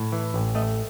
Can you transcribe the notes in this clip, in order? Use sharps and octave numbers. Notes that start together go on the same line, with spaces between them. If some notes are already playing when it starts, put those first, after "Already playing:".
Already playing: A2
E3
A1
A3 D#5